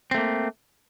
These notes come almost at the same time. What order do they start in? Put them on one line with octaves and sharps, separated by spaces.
C4 A3 A#3